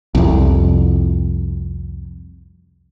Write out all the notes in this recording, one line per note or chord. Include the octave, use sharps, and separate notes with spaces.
C2 F2